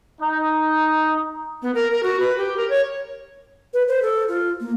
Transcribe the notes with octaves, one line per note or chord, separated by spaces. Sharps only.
D#4
B3
A#4
A#4
F#4
B4
G4
A#4
C#5
B4
C5
A4
F4
A#3